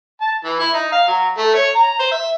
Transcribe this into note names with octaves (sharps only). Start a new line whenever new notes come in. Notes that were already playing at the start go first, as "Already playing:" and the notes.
A5
E3
E4
D#4
F5
F#3
A3
C#5
A#5
C5
E5